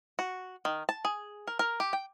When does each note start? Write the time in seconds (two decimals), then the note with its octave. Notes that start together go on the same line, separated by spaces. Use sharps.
0.19 F#4
0.65 D#3
0.89 A5
1.05 G#4
1.47 A#4
1.59 A#4
1.80 G4
1.93 G5